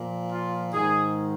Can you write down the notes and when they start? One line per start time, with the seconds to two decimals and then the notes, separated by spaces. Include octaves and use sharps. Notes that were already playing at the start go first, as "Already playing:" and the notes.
Already playing: A#2 F3
0.30 F4
0.73 G#2 D#3 G#4